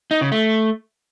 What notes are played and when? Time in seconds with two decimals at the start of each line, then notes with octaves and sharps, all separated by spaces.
0.11 D#4
0.21 C#3
0.32 A3